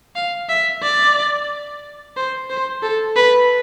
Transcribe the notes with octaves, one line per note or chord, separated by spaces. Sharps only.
F5
E5
D5
C5
C5
A4
B4